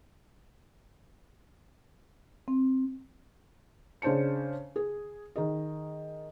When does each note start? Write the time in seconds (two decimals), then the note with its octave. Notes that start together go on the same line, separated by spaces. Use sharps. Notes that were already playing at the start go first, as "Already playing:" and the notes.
2.48 C4
4.02 C#3 D4 C5 A5 C#7
4.76 G#4
5.36 D#3 G#4 D#5